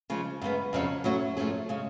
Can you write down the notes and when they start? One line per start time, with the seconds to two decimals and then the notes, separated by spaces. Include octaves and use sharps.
0.10 C#3 F3 G#3
0.41 F#2 C#3 G#3 B3
0.73 F2 C#3 F#3 C#4
1.04 F#3 A3 C#4 F#4
1.37 F#2 F3 A3 C#4 G#4
1.69 C#3 G#3